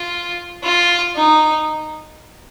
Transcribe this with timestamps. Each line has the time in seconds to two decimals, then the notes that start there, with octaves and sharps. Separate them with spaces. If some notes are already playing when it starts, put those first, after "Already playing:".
Already playing: F4
0.64 F4
1.16 D#4